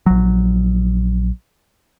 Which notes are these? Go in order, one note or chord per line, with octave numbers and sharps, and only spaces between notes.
A#1 F#3